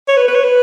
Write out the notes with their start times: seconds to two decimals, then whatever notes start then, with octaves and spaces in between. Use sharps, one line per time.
0.08 C#5
0.17 B4
0.28 B4
0.35 C#5
0.44 B4